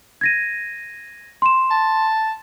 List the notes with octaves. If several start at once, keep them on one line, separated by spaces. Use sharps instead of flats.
G#6 A#6 D#7
C6 E7
A5